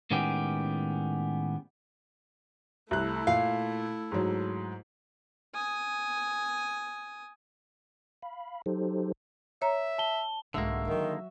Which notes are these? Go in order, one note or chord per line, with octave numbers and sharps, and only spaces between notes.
A2 D#3 G#3 B3 C#4 G4
C2 A3 E4 F#6
A#2 F5
G#2 F#3
G#5 D#6
F5 B5
F#3 D#4 G4 A4 C5
C#5 E5 A#5
A5 G7
C2 G#2 D3 G#3 A#3 F#4 E5
D#3 F3 F#3